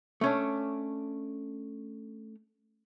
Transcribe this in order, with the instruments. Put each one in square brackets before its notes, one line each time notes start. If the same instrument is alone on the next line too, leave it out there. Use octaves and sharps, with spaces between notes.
[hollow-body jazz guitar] A3 C#4 D4